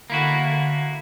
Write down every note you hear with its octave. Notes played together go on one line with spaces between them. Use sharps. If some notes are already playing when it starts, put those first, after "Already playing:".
D3 A#3 E4 F#4